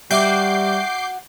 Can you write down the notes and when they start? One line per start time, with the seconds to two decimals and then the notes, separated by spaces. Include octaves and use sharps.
0.11 G3 F#4 E5 G5 D6 G6 C7